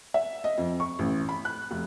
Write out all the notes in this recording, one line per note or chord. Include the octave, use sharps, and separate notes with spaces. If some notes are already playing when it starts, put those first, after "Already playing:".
E5
D#5
F2
C#6
A1
B5
F#6
F1